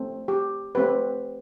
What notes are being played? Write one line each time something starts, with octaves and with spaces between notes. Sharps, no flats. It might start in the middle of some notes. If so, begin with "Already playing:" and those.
Already playing: A3 C4
G4
A3 C4 G4 B4